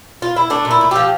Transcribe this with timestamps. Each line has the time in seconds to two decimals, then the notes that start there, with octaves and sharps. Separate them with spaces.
0.22 F4
0.36 E4
0.50 A3 D4
0.65 A#2
0.71 E4
0.81 A3
0.91 F3 G4